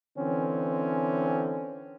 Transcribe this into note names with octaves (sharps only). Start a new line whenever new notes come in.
D3 E3 C4 C#4